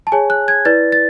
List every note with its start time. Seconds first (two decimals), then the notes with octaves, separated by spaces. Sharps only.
0.07 A5
0.12 G#4 C#5 G#5
0.30 F#6
0.48 G#6
0.65 E4 B4 D5 A6
0.92 A6